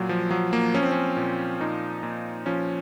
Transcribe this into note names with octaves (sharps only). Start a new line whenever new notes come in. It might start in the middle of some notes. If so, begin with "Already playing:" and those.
Already playing: A#2 F#3
F3
F3 F#3
A#3
F3 C#4
C4
C#4
A#2
A#2 D#4
A#2
F3 C#4